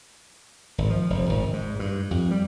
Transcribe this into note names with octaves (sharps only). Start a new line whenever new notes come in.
G#1
F3
F1
G#1
G#2
G2
F2
G3